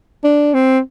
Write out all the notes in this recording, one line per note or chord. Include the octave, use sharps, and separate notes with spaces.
D4
C4